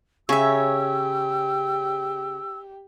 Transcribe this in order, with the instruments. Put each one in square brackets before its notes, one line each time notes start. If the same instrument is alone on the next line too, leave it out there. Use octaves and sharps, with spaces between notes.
[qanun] C#3 [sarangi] G4 [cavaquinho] C#5 E5 [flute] E6